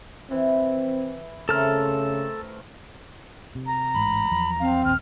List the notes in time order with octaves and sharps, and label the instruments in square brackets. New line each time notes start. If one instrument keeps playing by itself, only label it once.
[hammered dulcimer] E3 [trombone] C4
[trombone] C#3 [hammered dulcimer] A3 C4 A#4 [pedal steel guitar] A4 F6
[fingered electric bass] C3
[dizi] A#5
[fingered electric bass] A1 G#2 [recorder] B5
[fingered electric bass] E2 F3 F#3
[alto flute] C4 [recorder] F5
[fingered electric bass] D#1 G#1 D#2 [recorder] F6